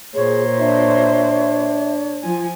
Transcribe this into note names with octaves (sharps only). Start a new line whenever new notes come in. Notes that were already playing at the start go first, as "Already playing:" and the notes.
A#2 G#4 C5 C#5
D4 E5
F3 F4 G#5